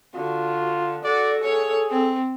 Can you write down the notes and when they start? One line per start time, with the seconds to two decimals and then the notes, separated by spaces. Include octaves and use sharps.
0.15 D3 F4 F#4
1.04 F#4 A4 D5
1.43 G#4 C#5
1.90 C4